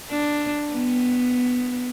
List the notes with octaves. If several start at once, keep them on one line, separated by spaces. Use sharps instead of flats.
D4
B3